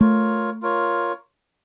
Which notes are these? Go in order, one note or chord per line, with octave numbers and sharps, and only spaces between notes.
A3 F4 A#4 C#5
F4 A#4 C#5